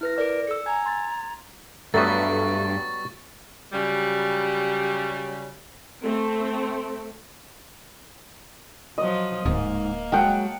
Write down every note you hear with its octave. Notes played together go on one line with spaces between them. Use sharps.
E4 B4 F6 A#6
A#4 D5
A4 E6 C#7
G#5 A#5 G#6
C6 G#6 A6
G2 F#3 G3 A3 B3 C#6 A6
C#3 F#3 G3
A3 C4
F3 F#3 D#5
D1 G#2 A#3
F#3 G#3 F#5 G5 A5